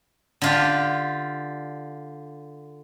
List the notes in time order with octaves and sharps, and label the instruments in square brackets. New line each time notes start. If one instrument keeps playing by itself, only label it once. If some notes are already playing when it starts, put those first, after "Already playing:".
[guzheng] D3 F4 G4